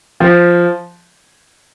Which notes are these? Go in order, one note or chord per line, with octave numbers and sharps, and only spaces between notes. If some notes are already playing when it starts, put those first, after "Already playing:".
F3